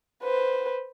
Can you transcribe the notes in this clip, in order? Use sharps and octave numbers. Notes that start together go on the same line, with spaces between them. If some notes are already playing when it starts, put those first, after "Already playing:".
B4 C5